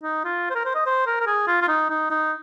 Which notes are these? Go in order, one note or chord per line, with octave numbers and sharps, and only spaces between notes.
D#4
F4
C5
A#4
C5
D#5
C5
A#4
A#4
G#4
F4
F4
D#4
D#4
D#4